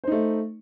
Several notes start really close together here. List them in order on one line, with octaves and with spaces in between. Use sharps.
C5 D#4 A3